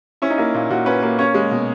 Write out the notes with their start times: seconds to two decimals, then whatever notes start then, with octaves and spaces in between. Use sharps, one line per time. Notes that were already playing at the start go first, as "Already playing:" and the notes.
0.22 C#4 E4
0.30 D#4
0.38 A#3 E4
0.54 A#2
0.70 A#2 F#4
0.86 C#4 B4
1.03 A#3 B4
1.19 C#4 C#5
1.34 G#3
1.51 B2